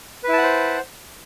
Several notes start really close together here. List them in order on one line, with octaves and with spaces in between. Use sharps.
B4 E4 A5 F#5 C5